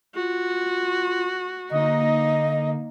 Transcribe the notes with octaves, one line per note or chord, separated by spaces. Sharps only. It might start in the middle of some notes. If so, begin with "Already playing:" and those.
F4 F#4
D3 A#3 D#4 D#5